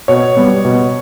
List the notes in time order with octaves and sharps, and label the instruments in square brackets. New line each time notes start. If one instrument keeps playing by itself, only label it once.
[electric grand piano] B2 C#5
G3 B3
B2